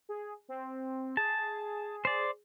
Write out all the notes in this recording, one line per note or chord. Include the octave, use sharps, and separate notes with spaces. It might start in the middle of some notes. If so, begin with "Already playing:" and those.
G#4
C4
G#4 A5
C5 D5